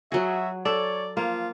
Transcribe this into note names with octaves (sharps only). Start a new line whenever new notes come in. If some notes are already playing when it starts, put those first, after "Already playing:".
F#3 F#4 G#4 E5
A4 C#5 D5
F3 A#3 F4